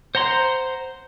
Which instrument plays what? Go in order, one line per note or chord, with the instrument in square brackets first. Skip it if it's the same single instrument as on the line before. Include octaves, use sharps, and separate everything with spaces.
[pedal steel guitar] C5 F#5 A#5 C6